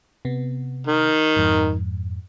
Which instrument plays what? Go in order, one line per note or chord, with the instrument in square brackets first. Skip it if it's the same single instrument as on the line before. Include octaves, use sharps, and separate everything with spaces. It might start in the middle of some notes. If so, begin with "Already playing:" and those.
[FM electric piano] C3 B3
[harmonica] D#3
[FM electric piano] F2 G#2